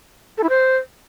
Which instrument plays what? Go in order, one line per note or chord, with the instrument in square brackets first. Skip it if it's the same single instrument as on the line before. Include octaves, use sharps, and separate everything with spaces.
[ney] A4
E4
C5